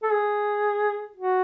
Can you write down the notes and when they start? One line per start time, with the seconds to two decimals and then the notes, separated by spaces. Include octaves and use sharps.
0.03 A4
0.11 G#4
1.16 F#4